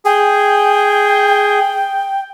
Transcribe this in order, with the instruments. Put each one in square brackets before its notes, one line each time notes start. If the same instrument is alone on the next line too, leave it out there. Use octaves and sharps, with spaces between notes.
[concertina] G#4 [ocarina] G5